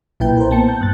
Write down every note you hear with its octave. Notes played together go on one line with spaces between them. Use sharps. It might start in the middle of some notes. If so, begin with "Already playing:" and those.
B1 A#2 E4 B4 G5 G6
A#4 C5
A#3 B3 A5 C#7
G6
G2 F#6 A6